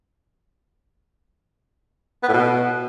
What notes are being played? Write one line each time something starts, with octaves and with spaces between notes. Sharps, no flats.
B3
A2
B2